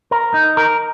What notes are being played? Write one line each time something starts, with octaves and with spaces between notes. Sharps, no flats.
A#4
D#4
A#4